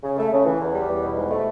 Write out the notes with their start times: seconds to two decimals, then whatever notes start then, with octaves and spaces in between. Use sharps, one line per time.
0.03 C#3
0.18 A3
0.32 C#3
0.45 E3
0.61 E2
0.75 G3
0.89 E2
1.03 B2
1.16 G#2
1.31 A3